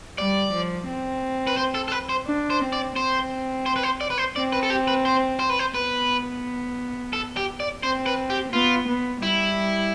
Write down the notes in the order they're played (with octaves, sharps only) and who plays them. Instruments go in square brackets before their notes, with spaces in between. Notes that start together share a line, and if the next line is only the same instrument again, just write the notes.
[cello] G3 [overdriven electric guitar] D5
[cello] F3
C4
[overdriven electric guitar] B4
C5
A4
A4
B4
C5
[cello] D4
[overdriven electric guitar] C5
[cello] C4
[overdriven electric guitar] D5
[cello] C4 [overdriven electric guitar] C5
[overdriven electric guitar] C5
B4
C5
D5
B4
C5
[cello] C4 [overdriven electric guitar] D5
[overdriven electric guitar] B4
A4
G4
B4
C5
C5
B4
C5
[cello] B3 [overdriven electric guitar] B4
[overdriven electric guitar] A4
G4
D5
[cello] C4 [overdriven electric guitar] C5
[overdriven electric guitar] B4
G4
[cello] B3 [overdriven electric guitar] F4
[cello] B3
[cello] G3 [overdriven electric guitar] E4